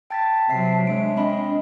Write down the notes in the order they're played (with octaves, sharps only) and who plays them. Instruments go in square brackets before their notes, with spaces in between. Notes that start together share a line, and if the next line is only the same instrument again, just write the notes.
[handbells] G5 A6 B6 [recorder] A5
[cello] C3 F#3 [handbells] E5 B6 C7
[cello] G#3 [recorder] D4 [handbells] C#5 E5 D7
[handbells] C4 B5 [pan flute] D4 [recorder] D#5